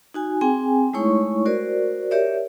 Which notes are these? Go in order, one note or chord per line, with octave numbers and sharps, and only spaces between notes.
D#4 F#4 G#5
C4 G#4 G5 G#5
G#3 A3 D#4 E4 C#5 C#6
F#4 A#4 C5 D5
G4 A#4 C#5 D5 E5